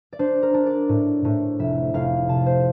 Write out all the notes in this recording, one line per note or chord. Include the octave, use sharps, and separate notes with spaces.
D5
D4 C5
A#4
D4
D5
A2
A2
F1 E5
F1 F5
C3 A5
C5